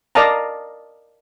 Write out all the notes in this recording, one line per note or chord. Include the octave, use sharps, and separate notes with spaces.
A#4 D5 D#5 F5 A5 A#5